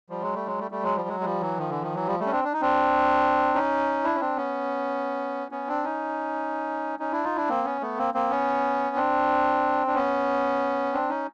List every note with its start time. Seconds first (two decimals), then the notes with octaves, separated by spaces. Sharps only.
0.10 F3 G3
0.22 F#3 G#3
0.34 G3 A3
0.46 F#3 G#3
0.59 G3 A3
0.71 G3 A3
0.83 F#3 G#3
0.96 F3 G3
1.08 F#3 G#3
1.20 G#3
1.25 F3 G3
1.41 E3 F#3
1.57 D#3 F3
1.70 D3 E3
1.82 D#3 F3
1.94 E3 F#3
2.07 F3 G3
2.20 G3 A3
2.26 C#4
2.31 C4 D4
2.44 D4
2.53 D#4
2.61 C4 D4
3.55 C#4 D#4
4.04 D4 E4
4.15 C#4
4.20 C4 D4
4.37 B3 C#4
5.51 B3 C#4
5.68 C4 D4
5.84 C#4 D#4
6.99 C#4 D#4
7.12 D4 E4
7.24 D#4 F4
7.36 D4 E4
7.49 A#3 C4
7.64 B3 C#4
7.81 A3 B3
7.98 A#3 C4
8.14 A#3 C4
8.30 B3 C#4
8.96 C4 D4
9.87 D4
9.94 B3 C#4
10.93 C4 D4
11.09 C#4 D#4